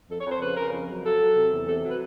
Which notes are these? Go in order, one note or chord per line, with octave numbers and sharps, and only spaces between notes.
F2 A4
C#5
F2 C5
C#3 B4
C#3 A#4
F2
F#3
F#3 A4
F#3
C3
E2
C3 A4
F#3 B4